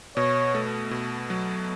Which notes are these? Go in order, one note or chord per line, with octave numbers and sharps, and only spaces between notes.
B2 C#5
A3
B2
F#3